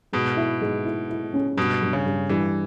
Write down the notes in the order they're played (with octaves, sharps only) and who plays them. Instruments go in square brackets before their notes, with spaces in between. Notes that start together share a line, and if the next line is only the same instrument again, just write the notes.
[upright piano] G#2 [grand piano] B2
[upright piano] E4
G#2
E4
E4
C#4
[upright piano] G2 [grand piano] B2
[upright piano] G2
[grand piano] C#3
[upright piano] G2
[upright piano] G2 [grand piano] E3